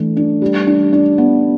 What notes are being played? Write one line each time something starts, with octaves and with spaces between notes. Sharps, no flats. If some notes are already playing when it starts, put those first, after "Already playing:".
Already playing: E3 A3 D4
D4
G3
D4
D4
B3